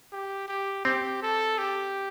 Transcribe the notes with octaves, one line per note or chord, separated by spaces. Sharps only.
G4
G4
C4 G4
A4
G4